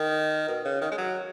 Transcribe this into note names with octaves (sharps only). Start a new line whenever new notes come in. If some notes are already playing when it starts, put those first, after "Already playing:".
Already playing: D#3
B2
C#3
D#3
G#3
F#3